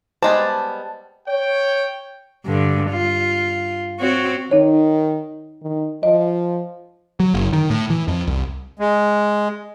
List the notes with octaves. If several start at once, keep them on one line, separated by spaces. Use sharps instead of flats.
G3 G#3 B3 C5 D#5 G#5 A5
C#5 G5
G2 D3
F4
C4 F#4 C#5
D#3 D#4 C#5
D#3
F3 D#5
F#3
F#1
D#3
A2
E3
F2
C2
G#3